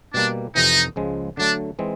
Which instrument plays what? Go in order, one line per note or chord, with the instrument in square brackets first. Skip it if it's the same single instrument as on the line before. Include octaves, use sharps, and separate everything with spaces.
[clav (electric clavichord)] B2 G3 A#3 [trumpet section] D4
[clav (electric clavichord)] F2 C3 E3 [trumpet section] D#4
[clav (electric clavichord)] C#2 C#3 F3 G#3
[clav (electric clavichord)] D3 F#3 A3 [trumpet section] D4
[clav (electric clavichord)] E3 G#3 C4 D#4